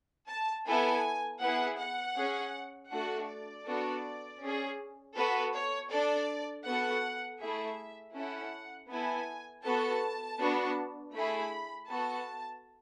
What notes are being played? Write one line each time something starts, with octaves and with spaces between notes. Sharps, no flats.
A5
B3 E4 A4 G#5
B3 E4 G#4 F#5
F#5
C#4 G#4
A3 D4 F#4 A4 F#5
D5
B3 D4 F#4 A4
C#4 G#4
B3 F#4 A4 B4
C#5
D4 A4 D5
B3 F#4 A4 F#5
A3 E4 G#4 E5
C#4 E4 A4 F#5
B3 E4 A4 G#5
B3 F#4 A4 A5
B3 D4 F#4
A3 E4 G#4 B5
B3 F#4 A4 A5